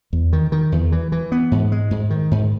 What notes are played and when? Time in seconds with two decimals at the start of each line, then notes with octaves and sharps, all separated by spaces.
0.13 E2
0.33 D#3
0.52 D#3
0.72 E2
0.92 E3
1.12 E3
1.32 B3
1.51 G#2
1.72 G#3
1.91 G#2
2.10 D#3
2.31 G#2